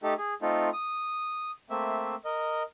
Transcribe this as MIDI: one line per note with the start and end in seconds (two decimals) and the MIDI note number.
0.03 0.14 57
0.03 0.14 63
0.03 0.14 67
0.03 0.14 69
0.18 0.34 68
0.42 0.69 57
0.42 0.69 60
0.42 0.69 63
0.42 0.69 65
0.42 0.69 69
0.73 1.51 87
1.70 2.15 57
1.70 2.15 58
1.70 2.15 60
1.70 2.15 76
2.25 2.63 70
2.25 2.63 75